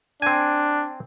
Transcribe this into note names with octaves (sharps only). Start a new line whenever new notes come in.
C4 D4 G#5